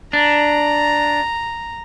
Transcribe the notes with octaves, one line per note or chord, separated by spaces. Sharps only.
D4 A#5